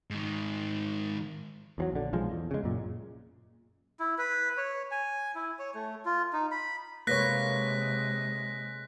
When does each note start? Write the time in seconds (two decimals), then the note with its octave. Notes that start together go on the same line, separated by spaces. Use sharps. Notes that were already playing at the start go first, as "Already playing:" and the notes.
0.10 G#2 D#3
1.78 E2 F3 F#3
1.92 A#1 D3
2.13 B1 F3 G#3
2.32 E2
2.51 C#3 G#3
2.64 F#2 A#2
4.00 E4
4.18 B4
4.57 C#5
4.91 G#5
5.35 E4
5.59 C#5
5.75 A3
6.05 F4
6.33 D#4
6.51 B5
7.07 C3 G#3 A#3 B4 C#5 F#6 A#6 B6